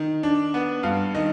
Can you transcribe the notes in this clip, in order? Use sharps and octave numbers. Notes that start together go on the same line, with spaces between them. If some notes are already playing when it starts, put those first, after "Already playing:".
Already playing: D#3
D4
B3
G2 F5
D#3 D#5